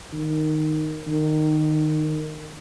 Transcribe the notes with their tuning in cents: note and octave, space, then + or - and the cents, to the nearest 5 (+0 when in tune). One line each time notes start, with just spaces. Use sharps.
D#3 -5
D#3 -15